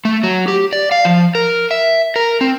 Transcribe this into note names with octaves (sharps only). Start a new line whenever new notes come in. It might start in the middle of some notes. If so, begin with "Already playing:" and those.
A3
F#3
G4
D5
F5
F3
A#4
E5
A#4
C4